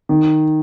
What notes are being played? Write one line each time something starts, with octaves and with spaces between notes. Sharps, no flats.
D#3